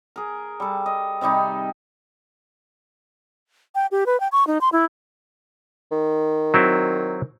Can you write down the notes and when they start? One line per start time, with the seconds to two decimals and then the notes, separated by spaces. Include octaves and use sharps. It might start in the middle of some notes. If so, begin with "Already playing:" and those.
0.16 G#4 A#4
0.60 G3 A4
0.86 D#5
1.21 C3 D#3 G3 D#4
3.75 G5
3.91 G4
4.06 B4
4.20 G5
4.32 C#6
4.47 D#4
4.61 C6
4.72 E4
5.92 D#3
6.54 F#3 C4 E4